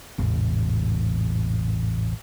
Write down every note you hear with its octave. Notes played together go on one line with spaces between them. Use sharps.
A1 E2 G#2 C3